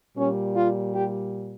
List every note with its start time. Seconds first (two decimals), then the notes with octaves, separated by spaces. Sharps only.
0.17 A#2 G3 C#4
0.54 F4
0.93 G4